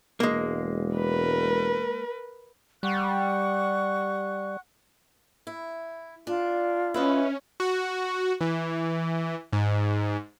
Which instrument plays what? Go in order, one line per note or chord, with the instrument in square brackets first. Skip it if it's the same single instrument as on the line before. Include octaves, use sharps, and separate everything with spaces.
[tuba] E1 [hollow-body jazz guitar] G#3 A#3
[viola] A#4 B4
[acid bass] G3 [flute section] F#5 C#6 F#6
[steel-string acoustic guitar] E4
[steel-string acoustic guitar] D4 [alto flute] F4
[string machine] C#4 [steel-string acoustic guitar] E4 B4 D#5
[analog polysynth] F#4
E3
G#2